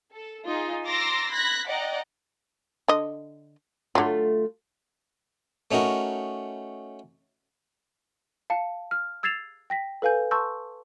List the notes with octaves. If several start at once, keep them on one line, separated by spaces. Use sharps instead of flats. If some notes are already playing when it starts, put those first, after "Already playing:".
A4
D#4 F4 G#4
A#5 C6 D6 E6 A6 A#6
B5 F#6 G#6 A#6 B6
D5 D#5 F#5 G5 A#5
D3 D#5
D3 F#3 A3 F4
A3 C#4 D#4 F#4 A#4
F5 A5 C#7
F6
E6 G#6 A6 C7 E7 F7
G5 A#6 B6
A4 B4 F5 G#5 G6
A5 C6 C#6 E6 G6